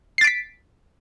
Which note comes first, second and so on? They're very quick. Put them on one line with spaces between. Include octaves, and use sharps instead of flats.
C7 A6 D7 B6